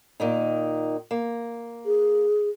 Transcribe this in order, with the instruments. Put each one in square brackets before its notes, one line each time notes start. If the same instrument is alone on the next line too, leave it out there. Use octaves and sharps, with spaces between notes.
[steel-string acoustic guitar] A#2 D#3 D#4
A#3
[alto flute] G#4